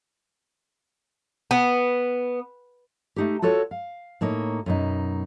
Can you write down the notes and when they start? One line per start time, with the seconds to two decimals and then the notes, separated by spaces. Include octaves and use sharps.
1.51 B3
3.16 A3 D#4 G4
3.42 F4 F#4 A4 C#5
3.71 F5
4.21 A2 A#3 D#4 C#5
4.66 F#2 B2 D#4